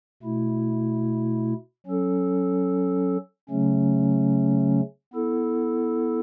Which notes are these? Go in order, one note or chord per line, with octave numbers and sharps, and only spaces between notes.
B2 A3 E4
F#3 C#4 A4
C#3 F#3 A3 C#4
B3 E4 A4